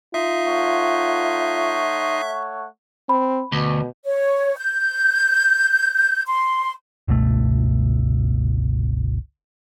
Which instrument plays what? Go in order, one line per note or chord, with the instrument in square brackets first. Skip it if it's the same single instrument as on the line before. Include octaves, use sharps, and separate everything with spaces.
[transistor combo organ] D#4 C6 [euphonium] F4 [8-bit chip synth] E5
[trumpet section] A3 C#5 F#5
[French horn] C4 [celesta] B5
[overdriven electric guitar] D2 [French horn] B2
[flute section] C#5
G6
C6
[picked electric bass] G1 C#2 B2 A3